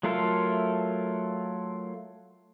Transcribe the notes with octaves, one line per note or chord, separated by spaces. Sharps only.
F#3 A3 F4 A4 A#4